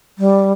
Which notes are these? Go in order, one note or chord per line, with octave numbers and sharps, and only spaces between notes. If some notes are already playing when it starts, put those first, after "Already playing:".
G3